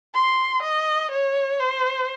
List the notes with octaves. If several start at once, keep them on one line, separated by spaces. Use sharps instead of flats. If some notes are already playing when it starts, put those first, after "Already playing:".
C6
D#5
C#5
C5